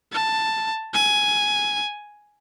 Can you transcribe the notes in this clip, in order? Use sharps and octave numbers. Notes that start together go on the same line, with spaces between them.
A5
G#5